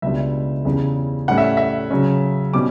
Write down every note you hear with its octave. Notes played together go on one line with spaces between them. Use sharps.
C#2 B2 G3 D4 E5
E2 C#3 G3 C#4
A2 G3 C#4 F#5
E5
E5
C#3 F#3 C#4
B2 G3 C#4 D6